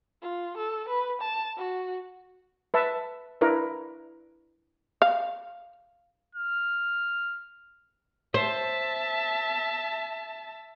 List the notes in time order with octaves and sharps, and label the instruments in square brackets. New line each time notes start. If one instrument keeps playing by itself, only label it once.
[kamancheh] F4
A4
B4
A5
F#4
[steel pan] B4 E5 A5
D4 E4 A#4 B4
[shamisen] F5
[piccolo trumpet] F6
[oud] C5 [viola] E5 A5